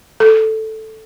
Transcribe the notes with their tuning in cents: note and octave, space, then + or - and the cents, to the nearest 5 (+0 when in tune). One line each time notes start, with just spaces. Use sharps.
A4 +0